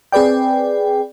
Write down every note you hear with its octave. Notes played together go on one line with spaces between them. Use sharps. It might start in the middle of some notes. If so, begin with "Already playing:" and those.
C4 G#4 B4 D5 G5